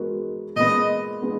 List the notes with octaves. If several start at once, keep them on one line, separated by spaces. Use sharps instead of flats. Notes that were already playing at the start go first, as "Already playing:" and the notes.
Already playing: G#3 B3 F#4 A#4
A#2 G#3 B3 D#5
G#3 B3